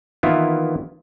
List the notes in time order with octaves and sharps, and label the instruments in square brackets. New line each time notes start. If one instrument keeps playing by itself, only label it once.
[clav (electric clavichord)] D#3 E3 A#3 B3 E4 F4